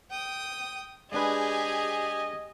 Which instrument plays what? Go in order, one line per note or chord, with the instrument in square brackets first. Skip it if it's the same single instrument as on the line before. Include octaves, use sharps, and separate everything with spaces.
[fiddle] G5 D#6
[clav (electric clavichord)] G#3 D4 B4 [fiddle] G4 G#5 [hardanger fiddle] G#4 [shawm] D#5